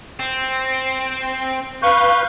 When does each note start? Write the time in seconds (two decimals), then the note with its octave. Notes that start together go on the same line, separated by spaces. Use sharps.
0.19 C4
1.82 B4 F5 C#6 G6